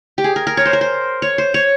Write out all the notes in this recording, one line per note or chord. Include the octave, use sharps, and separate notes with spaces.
G4
G#4
A#4
A#4
C#5
C5
A#4
C5
C#5
C5
C#5